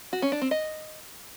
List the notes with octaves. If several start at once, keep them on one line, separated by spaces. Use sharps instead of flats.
F#4
C#4
D4
C4
D#5